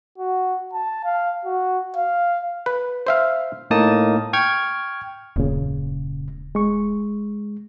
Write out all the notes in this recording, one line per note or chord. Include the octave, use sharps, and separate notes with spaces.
F#4
A5
F5
F#4
F5
B4
C5 E5 F5
A2 A#3 D#4 A5 D#6
G5 C#6 F6 G#6
D#1 F#2 A#2 C#3
G#3 C#6